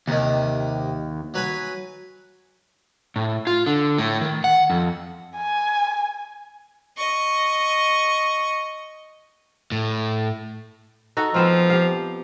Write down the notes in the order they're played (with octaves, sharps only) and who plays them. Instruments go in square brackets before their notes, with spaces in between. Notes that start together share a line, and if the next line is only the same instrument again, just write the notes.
[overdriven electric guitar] D#2 [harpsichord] C3 D#3
[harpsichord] F#3 B4 G#5
[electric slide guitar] A2
F4
D3
A2
D#3
F#5
F2
[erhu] G#5
[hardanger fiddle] D#5 C#6
[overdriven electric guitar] A2
[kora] D#4 F#4 A4
[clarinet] F3 [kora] B3 C4 F4
[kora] G4 F5